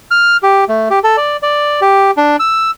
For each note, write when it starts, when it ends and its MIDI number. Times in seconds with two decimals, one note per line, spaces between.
0.11 0.37 89
0.43 0.64 67
0.69 0.88 57
0.90 0.99 67
1.04 1.16 69
1.17 1.37 74
1.43 1.80 74
1.82 2.11 67
2.17 2.36 62
2.40 2.71 88